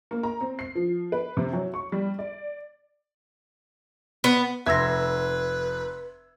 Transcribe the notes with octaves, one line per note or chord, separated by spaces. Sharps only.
A#3
A#5
C4
C7
F3
B4
C3
F#3
C#6
G3
D5
B3
F1 B4 E5 C6 E6 G#6 A#6